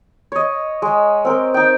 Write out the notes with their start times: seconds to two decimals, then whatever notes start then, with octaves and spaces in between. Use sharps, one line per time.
0.32 C#5 D#5
0.82 G#3
1.25 C4 A#4
1.54 D#4 G5